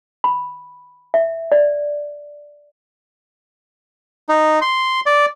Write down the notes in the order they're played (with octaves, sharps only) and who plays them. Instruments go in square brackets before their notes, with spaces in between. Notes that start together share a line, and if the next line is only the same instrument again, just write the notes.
[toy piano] B5
E5
D5
[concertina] D#4
C6
D5